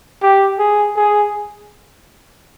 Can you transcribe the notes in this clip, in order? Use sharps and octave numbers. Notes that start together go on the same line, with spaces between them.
G4
G#4
G#4